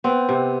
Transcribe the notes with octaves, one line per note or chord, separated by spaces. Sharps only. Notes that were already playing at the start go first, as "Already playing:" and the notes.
B3 C4
C3